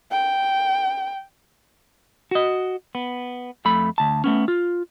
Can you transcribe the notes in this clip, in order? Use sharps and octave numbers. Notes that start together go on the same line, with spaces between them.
G5
F#4 D#5
B3
F2 A3 B5
D2 A5
A3 B3 C#4
F4